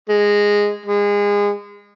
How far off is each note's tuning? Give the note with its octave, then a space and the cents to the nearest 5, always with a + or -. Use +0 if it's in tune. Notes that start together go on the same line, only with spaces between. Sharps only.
G#3 -10
G#3 -30